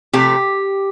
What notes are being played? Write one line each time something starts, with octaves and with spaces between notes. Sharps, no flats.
C3 F3 A3 G4